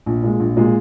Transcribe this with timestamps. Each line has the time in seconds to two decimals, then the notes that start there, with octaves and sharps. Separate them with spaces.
0.06 A#1
0.23 A#2 G#3
0.40 A#1
0.57 A#2 G#3